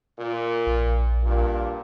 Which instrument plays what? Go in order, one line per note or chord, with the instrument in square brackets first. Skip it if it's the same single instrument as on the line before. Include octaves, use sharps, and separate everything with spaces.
[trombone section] A#2
[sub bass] A#1
[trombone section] G2 A#2